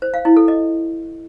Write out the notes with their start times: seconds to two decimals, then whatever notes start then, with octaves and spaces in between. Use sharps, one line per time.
0.02 C5
0.14 F5
0.25 E4
0.37 A4
0.48 D#5